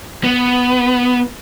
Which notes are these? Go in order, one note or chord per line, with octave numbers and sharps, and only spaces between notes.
B3